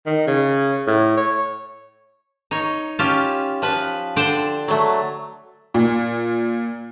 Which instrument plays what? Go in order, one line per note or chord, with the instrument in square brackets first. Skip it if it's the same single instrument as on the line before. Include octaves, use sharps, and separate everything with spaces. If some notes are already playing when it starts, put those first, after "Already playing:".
[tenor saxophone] D#3
C#3
A2
C#5
[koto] D#4 C#5
C#4 F4 G4 F5 A5
F3 B4
D3 D4 C5 G5 A5
F#3 A3
[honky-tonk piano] A#2